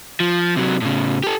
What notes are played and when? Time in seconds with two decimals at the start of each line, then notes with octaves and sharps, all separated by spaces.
0.20 F3
0.56 C3 F#3
0.82 A2 C#3
1.24 G4 A4